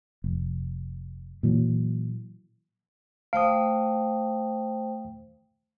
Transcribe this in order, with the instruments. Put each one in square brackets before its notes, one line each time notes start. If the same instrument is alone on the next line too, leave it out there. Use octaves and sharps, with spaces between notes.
[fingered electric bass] F1
A#2 E3 F#3
[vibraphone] A3 C5 G5 [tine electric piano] F5 D#6